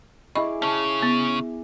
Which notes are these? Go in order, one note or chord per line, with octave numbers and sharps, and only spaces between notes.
E4 G#4 D#5 B5 C#6 D6
C#3 C#4 A5
B3